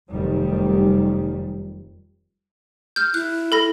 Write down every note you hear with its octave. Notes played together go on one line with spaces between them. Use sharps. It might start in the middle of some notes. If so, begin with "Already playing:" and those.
F1 F#2 D#3 G3
F6 G6
E4 F#6
A4 B5 A#6